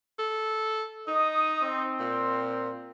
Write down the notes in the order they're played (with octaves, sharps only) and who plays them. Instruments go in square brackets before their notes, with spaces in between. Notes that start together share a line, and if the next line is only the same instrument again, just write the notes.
[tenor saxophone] A4
[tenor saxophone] D#4 [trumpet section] D#5 D#6
[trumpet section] C4
[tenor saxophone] A#2